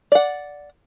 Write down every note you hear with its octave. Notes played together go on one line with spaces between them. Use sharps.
D5 F#5